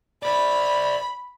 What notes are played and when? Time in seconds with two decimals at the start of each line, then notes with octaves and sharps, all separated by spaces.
0.23 C5 D5 B5